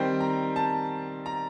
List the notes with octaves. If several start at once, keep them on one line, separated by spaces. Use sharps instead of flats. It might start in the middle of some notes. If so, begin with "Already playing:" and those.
Already playing: D#3 G3 C4 G5
A#5
A5
A#5